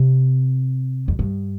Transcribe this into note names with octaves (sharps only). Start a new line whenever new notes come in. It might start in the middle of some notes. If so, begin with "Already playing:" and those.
Already playing: C3
F2
G2